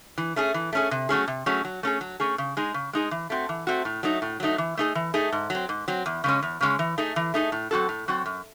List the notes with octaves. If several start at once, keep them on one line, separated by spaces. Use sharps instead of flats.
E3
A3 C#4 G#4
E3
A3 C#4 G#4
C3
F#3 A3 C#4 G#4
C3
F#3 A3 C#4 G#4
F#3
A3 C#4 G#4
F#3
A3 C#4 G#4
C#3
G#3 D#4 G#4
C#3
G#3 D#4 G#4
E3
A3 C4 F#4
E3
A3 C4 F#4
A2
F#3 A3 D#4
A2
F#3 A3 D#4
E3
A3 D#4 G#4
E3
A3 D#4 G#4
G#2
F#3 C4
G#2
F#3 C4
E2
C#3 G#3 C#4
E2
C#3 G#3 C#4
E3
A3 D#4 G#4
E3
A3 D#4 G#4
A2
F#3 C4 F#4 A4
A2
F#3 C4 F#4 A4
F#2